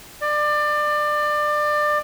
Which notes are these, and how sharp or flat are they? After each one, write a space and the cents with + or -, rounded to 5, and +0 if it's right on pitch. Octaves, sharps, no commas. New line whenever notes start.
D5 +25